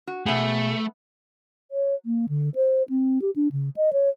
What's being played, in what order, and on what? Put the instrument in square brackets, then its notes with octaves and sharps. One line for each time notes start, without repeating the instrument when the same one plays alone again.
[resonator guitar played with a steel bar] F#4
[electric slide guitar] B2 G#4 [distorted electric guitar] A3 [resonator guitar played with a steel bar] B3 E5
[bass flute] C#5
A#3
D3
C5
C4
G4
D4
C#3
D#5
C#5